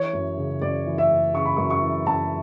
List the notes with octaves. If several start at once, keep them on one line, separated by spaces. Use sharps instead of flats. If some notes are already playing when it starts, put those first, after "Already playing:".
Already playing: E3 C#5
F#2
C#3
F#2 D5
E3
E5
F#2
C#3 C#6
B5
F#2 C#6
C#6
E3
F#2 A5